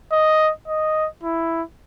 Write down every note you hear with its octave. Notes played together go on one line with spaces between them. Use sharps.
D#5
D#5
E4